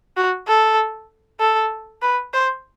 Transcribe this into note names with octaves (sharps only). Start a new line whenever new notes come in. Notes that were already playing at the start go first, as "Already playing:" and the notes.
F#4
A4
A4
B4
C5